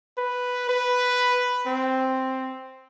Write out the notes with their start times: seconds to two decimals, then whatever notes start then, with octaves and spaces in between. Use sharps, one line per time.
0.18 B4
0.69 B4
1.67 C4